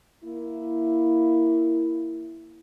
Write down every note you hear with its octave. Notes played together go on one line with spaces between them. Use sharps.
A#3 E4